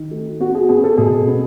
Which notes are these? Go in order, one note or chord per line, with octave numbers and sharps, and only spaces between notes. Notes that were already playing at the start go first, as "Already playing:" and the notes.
Already playing: D#3
A3
B3 F#4
G#4
B3 G#4
A4
B2 G#4
B3